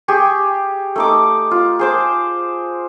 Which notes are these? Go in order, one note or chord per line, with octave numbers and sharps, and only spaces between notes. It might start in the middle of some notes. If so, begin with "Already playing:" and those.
G4 G#4 C#6
A3 D#4 D6
F4
G#4 C5 D6